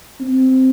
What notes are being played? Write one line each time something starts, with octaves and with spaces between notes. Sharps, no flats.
C4